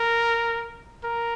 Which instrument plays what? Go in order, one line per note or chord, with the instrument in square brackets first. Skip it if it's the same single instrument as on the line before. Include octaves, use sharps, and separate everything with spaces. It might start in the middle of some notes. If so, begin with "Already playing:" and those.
Already playing: [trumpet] A#4
A#4